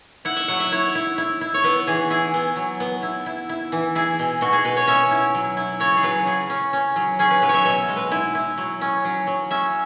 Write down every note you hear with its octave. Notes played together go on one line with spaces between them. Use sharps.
E4 F#5
E5
F#3 F#5
E5
E4 C#5
E4
E4
E4
C#5
B3 B4
E3 G#4
E4 G#4
B3
F#3
B3
E4
E4
E4
E3
E4 G#4
B2
B2 F#4
G#4
B2 B4
C#5
C#4 E5
E4
F#3
E4
C#3 C#5
G#4
F#3 B4
C#3 G#4
C#4
C#4
F#3
C#4 G#4
B4
F#3 B4
C#5
E5
B2 E5
G#3
B4
E4
E4
F#3
C#4
F#3
F#3
C#4 E5